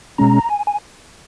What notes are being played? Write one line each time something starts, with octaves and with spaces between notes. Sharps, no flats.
B2 G#3 C#4 A#5
G#5
G#5